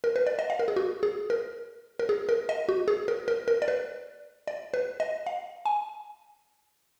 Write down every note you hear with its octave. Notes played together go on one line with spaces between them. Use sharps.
A#4
B4
D5
D#5
F5
A#4
G#4
F#4
G#4
A#4
A#4
G#4
A#4
D#5
F#4
G#4
A#4
A#4
A#4
D5
B4
D5
B4
D#5
F5
G#5